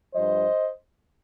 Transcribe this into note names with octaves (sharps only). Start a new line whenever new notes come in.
G2 F3 C5 D#5